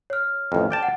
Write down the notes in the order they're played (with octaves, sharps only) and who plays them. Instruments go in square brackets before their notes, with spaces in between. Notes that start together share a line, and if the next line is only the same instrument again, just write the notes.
[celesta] C#5 F6
[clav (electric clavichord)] A1 F2
D5 G5 A5
[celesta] F#5